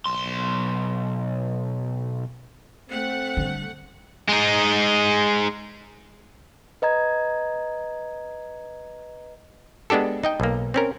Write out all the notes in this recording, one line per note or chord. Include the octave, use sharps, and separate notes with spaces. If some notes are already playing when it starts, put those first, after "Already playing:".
B1 C6
A3 C4 F#5
D3 G3
G#3 D#4
B4 D#5 A#5 G#6
G#3 B3 D4 G4 A4
D#4 D#5 G5
B1 A#3
C4 C#4 A#4